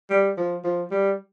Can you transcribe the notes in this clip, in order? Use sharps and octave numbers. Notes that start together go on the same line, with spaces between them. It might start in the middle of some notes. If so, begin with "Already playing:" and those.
G3
F3
F3
G3